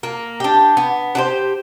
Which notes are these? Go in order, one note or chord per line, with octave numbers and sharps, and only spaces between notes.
A#3
D4 G4
B3
D4 G4 C5